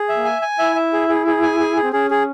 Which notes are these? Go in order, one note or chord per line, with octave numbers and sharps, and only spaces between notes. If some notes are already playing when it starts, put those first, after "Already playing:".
Already playing: G#4
E5
A#3
G#5
G#5
E4 E5
E5
G#4
G#4
G#4
G#5
G#4
G#4
C4
C#4 G#4
G#4